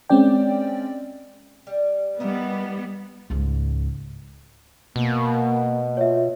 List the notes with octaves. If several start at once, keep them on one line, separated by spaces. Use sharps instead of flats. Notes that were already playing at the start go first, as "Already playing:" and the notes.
G#3 C4 C#4 D5 G5
G3
G3 B3 D#4 E4 A#4
C#2 G#2
B2 A#3
F4 C#5 E5